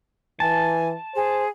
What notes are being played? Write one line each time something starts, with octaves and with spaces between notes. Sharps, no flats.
E3 G#5 A5
G#4 C5